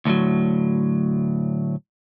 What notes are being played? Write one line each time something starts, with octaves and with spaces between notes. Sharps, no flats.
D2 A2 D#3 F#3